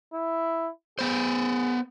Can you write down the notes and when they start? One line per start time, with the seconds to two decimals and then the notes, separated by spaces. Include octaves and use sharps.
0.13 E4
0.99 B3 G#4 C5